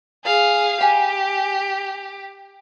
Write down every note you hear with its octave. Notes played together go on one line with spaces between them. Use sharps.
G#4 F5
G4 G#5 B5